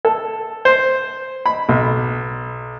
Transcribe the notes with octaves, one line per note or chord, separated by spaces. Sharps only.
A4
C5
B5
B1